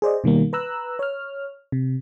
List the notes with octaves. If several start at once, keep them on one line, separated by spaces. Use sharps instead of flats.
G#4 C5 D5 D#5
B2 D#3 G3 A#3
B4 A#5 E6 F#6
C#5 F6
C3